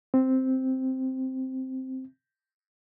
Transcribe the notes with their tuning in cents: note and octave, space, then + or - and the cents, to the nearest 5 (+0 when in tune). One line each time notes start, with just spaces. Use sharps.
C4 +0